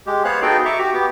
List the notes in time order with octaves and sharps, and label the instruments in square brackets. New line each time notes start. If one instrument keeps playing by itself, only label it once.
[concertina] G#3 G4
B3 C5 C#5 F5 F#6
B3 D#4 F#4 G#4 A4 G5
E5 A#5 C#6 D6
F#4 G4
B3 G4